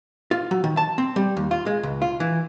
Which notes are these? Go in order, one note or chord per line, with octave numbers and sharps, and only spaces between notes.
F4
F#3
D#3
A5
C4
G3
D#2
F4
G#3
C#2
F4
E3